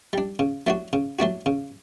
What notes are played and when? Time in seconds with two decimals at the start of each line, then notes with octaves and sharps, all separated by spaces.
0.13 G3 D4
0.39 C#3
0.67 F#3 A3 D4 F#4
0.93 C#3
1.19 F#3 A3 D4 F#4
1.46 C#3